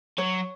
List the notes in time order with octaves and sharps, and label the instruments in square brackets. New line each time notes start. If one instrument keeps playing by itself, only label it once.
[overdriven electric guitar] F#3 [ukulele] C#5